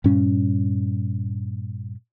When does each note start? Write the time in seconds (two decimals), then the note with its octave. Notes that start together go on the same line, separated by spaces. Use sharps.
0.04 G2 A#2 G3 C#4